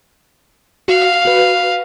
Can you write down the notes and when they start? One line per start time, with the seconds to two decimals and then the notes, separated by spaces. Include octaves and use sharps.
0.88 F#4 F5
1.25 F#4 B4